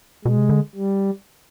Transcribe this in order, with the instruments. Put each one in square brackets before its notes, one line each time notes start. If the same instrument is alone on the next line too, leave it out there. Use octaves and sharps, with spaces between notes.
[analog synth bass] B2 [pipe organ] G#3
[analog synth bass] C3
D3
[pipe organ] G3